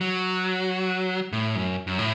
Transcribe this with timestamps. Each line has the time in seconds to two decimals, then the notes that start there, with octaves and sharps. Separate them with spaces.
0.01 F#3
1.32 A2
1.56 F#2
1.87 F#2
1.99 A2